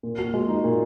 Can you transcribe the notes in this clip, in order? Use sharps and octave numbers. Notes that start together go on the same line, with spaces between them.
A#2
F#4
G#3
D#4
A#2